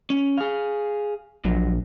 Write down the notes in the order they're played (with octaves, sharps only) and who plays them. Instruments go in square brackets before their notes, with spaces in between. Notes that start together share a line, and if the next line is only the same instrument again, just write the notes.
[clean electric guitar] C#4
G#4 F5
[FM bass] A#1 [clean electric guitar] A#2 F#3